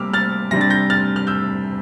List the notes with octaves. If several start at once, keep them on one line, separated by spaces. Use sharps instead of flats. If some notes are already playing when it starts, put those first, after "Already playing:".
Already playing: C3 G3 A#3 D6 E6 F6
F6 A6
C3 G3 D4 A#6
A6
G6 A#6
F6 A6
F6
E6 G6